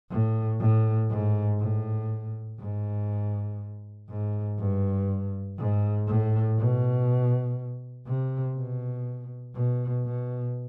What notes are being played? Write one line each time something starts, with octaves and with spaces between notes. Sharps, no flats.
A2
A2
G#2
A2
G#2
G#2
G2
G#2
A2
B2
C3
B2
B2
B2